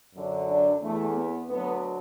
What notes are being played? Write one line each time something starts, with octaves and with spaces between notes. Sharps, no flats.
F#2 D3 F#3
D4
E2 E3 A3
B3
D2 D3 F#3 B3